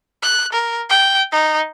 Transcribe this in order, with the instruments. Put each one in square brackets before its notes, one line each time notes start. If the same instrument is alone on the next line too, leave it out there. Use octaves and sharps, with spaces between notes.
[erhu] F#6
A#4
G5
D#4